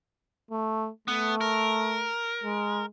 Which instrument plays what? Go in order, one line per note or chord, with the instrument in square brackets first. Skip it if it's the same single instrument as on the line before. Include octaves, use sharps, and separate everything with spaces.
[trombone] A3
[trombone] A3 [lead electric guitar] B3
[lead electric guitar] A#4
[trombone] G#3